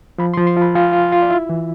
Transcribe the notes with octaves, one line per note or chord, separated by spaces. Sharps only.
F3 B5
C6
F3
C6
F4 B5
F4 G#5
F4
F4
D5
E4 E5
E3